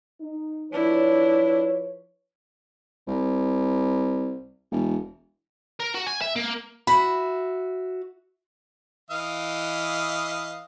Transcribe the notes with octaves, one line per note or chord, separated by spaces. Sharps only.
D#4
F3 D4 E4 B4 C#5
C2
E1
A#4
F#4
G#5
E5
A#3
F#4 E5 B5
E3 D#5 F5